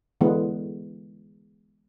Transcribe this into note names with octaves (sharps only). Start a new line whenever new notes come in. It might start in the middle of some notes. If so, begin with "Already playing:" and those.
D3 E3 G#3 B3